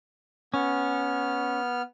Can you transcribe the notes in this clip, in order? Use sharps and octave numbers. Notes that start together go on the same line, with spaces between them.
B3 C#4 F6